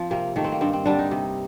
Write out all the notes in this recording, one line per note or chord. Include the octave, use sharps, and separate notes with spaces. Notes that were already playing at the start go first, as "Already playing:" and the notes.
Already playing: F3 C4
C3 A#3
D#3 A3 A#3
C4
A#3
G2 C4
C4
D3 G3 D4
D#4
C3